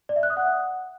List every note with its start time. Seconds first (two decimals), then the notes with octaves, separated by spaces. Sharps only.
0.09 D5
0.16 E5
0.23 F#6
0.30 D#6
0.37 F#5